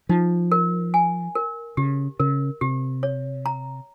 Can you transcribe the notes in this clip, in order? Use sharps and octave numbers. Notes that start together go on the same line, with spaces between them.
F3 D#4
A#4
G#5
A#4
C#3 G4
C#3 A#4
C3 G4
C#5
A#5